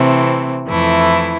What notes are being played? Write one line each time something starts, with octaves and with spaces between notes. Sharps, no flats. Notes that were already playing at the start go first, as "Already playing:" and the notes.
Already playing: C3 E3 A3 C4
F2 E3 A3 E4